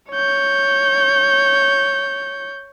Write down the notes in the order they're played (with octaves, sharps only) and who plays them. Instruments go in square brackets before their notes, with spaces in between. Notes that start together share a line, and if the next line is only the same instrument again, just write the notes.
[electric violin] C#5 G6